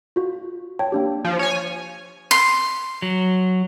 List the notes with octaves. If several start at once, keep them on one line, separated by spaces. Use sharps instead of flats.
F4 F#4
C#5 G5 A5
A#3 D4 G4
F3
C#5 G#5
C6
F#3